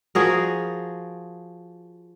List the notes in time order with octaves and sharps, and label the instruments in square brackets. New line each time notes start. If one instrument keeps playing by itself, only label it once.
[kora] F3 F#4 G#4 A#4